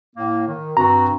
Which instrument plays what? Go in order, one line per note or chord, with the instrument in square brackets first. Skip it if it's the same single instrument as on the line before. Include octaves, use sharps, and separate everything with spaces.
[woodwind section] A2 A#3
D#3
[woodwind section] G2 C4 F#4 [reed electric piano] A#5